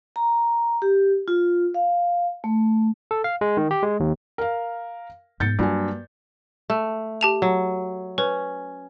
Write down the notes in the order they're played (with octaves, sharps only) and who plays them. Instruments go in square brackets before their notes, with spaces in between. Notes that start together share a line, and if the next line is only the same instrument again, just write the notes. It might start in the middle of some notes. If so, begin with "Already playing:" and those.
[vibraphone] A#5
G4
F4
F5
A3
[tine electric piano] A4
F5
G#3
D#3
G4
G#3
D#2
[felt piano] A#4 F5
[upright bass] G#2 B3 [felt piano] G6 A6 C#7
[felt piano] G2 F#3 G#5 [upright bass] A#3
[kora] A3
[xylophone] G4 A5 F7
[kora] F#3
[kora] C#4 [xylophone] B4